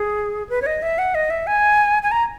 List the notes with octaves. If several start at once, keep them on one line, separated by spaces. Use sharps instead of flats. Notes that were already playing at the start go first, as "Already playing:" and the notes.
Already playing: G#4
B4
C#5
D#5
E5
F#5
D#5
E5
G#5
G#5
A#5